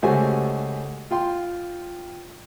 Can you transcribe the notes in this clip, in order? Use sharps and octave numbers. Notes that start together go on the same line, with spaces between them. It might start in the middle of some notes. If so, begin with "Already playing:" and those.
C#2 A3 F#4 G4 C5 G#5
F4 G5 C6